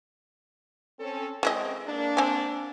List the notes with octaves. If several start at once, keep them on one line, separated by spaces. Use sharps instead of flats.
C4 C#4 A4
G#3 C4 E4 D#5
A#3 D4
C4 G#5